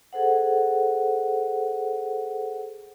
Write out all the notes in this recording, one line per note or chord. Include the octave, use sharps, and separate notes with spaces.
G#4 A4 C5 F#5